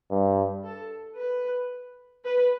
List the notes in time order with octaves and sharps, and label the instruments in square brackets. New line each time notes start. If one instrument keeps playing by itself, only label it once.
[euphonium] G2
[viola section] A4
B4
B4